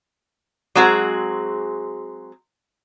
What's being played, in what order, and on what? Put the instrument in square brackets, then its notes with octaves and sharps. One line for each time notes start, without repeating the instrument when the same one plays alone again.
[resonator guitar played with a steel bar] F#3 G#3 C4 F#4 G#4